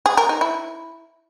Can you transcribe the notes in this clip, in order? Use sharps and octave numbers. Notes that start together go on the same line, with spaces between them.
G#4
A#4
D#4
E4